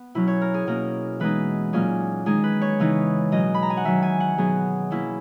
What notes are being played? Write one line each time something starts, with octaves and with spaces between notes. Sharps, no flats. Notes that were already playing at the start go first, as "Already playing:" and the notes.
Already playing: B3
B2 F#3 C#4 E4
C#5
A#4
G#4
B2 A#3 C#4 A#4
E3 G#3 B3 D#4 B4
A#2 F#3 A#3 C#4 G#4
D#3 G#3 D#4 G#4
B4
C#5
C#3 E3 B3 D#4
B2 F#3 C#4 D#5
B5
A#5
G#5
F#5
D#3 F#3 C#4 E5
G#5
F#5
B2 F#3 B3 D#4 G#4
B2 A#3 C#4 E4